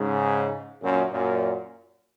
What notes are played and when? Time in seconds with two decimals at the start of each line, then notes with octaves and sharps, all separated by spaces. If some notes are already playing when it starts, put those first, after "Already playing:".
Already playing: G#2 C#3
0.82 F#2 A#2
1.12 F#2 A#2